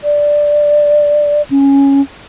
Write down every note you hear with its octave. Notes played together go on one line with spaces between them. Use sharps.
D5
C#4